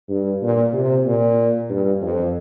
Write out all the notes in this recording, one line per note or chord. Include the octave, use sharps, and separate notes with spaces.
G2
A#2
C3
A#2
G2
F2